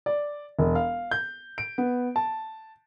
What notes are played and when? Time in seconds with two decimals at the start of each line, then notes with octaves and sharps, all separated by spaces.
0.06 D5
0.59 E1
0.75 F5
1.11 G6
1.58 D7
1.78 B3
2.16 A5